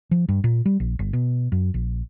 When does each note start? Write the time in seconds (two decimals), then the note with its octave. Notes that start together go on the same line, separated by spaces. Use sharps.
0.11 F3
0.29 G2
0.44 A#2
0.66 G3
0.80 A#1
0.99 G1
1.13 B2
1.52 F#2
1.74 A#1